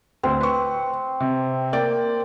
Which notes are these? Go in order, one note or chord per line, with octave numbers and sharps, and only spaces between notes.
D2 C4
B4 C#6
C3
A#3 D5 G5